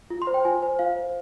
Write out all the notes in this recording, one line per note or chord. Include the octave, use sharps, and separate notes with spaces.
F4
C6
C5
G5
F4 G#5
C5
F4 F5
C5